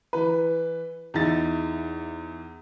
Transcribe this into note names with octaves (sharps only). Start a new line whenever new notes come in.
E3 B4
E2 D#4 E4 A6